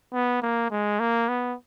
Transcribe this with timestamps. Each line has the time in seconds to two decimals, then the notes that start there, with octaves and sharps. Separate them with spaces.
0.13 B3
0.42 A#3
0.71 G#3
0.99 A#3
1.28 B3